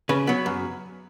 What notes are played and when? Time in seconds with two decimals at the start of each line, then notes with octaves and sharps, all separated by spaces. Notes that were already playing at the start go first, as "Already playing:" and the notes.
0.09 C#3 B4
0.27 F#3 B3
0.46 F#2